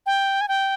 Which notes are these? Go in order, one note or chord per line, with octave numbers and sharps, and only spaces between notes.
G5
G#5
G5